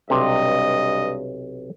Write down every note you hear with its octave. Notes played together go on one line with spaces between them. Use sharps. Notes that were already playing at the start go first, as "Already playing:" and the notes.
B1 G2 C3 D#5